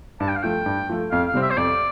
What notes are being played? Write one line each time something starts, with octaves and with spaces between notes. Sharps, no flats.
G2 A5
G5
F5
F3 A3 G5
G2
F3 A3
F2 F5
F5
C3 G3 C4
E5
C5
F2 D5